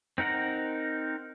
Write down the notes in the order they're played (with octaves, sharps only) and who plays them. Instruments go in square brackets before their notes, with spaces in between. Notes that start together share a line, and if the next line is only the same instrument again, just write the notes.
[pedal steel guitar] C4 D#4 A#4 F#5 A#5